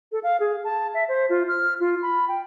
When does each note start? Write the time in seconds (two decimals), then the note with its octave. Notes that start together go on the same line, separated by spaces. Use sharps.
0.12 A4
0.23 F5
0.40 G#4
0.64 A5
0.94 E5
1.08 C5
1.30 F4
1.48 F6
1.80 F4
2.02 B5
2.28 G5